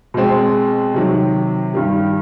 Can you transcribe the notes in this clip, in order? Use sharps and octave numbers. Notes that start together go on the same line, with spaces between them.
B2 G#3 C4
C3 D#3 F#3
G2 D#3 G3